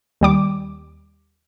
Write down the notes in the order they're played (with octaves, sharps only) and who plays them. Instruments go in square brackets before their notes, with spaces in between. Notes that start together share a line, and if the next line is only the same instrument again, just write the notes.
[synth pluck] D#2 G3 D6